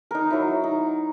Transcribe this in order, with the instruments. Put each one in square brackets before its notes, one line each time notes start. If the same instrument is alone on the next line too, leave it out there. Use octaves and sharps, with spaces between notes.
[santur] D#4 A#4
F#3 E4
D#4